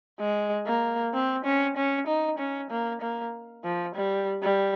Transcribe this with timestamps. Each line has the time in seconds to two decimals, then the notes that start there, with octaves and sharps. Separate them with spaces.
0.20 G#3
0.67 A#3
1.14 C4
1.45 C#4
1.77 C#4
2.07 D#4
2.38 C#4
2.71 A#3
3.01 A#3
3.64 F3
3.95 G3
4.43 G3